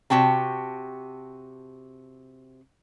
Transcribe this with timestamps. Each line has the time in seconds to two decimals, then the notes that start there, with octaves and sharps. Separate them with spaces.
0.10 C3 F#4 G5 A5